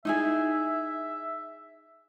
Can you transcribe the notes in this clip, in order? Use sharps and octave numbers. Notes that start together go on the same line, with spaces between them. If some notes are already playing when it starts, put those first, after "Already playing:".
D#4 E4 G#4 E5